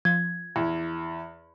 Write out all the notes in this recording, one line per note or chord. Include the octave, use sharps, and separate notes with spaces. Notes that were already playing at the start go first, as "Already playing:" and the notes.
F3 G#6
E2